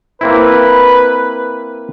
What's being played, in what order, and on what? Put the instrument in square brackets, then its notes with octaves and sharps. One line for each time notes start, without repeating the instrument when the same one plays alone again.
[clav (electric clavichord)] A#3 C4 E4 [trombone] B4